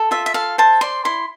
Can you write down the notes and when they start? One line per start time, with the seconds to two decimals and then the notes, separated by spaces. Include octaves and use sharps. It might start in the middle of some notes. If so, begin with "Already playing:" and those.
Already playing: A4
0.11 F4 E5
0.26 E5
0.34 A4 F5
0.58 C5 A5
0.81 D5 C6
1.05 E4 C6